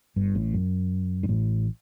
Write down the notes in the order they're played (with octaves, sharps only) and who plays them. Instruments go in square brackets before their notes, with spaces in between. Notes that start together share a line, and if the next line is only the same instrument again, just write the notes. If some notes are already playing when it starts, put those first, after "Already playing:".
[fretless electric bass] G1 G2
A1 A2
F#2
G2
A1 A2